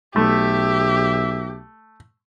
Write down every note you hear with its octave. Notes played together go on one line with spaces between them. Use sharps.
B1 A3 G4 E5